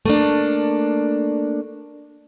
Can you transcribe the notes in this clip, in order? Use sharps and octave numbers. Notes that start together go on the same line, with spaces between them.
A3 A#3 D4